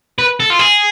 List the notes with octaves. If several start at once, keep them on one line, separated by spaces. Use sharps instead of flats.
B4
A4
F4
G#4